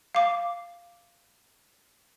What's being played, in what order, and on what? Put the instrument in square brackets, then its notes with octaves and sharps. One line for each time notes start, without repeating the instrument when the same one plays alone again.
[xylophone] F5 D6